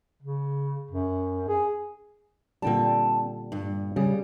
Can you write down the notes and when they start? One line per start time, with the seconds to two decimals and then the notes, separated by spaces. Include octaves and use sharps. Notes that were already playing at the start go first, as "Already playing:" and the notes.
0.23 C#3
0.91 F#2
1.48 G#4
2.62 A#2 D3 G3 C4 G5 A5
3.52 G2
3.96 C#3 G3 G#4